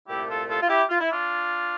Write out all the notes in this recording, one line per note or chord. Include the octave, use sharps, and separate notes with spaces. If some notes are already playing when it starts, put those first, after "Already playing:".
C2 A#2 A3 E4 G4
F4 A4
F4 A4
F4
E4 G4
F4
E4
D4 F4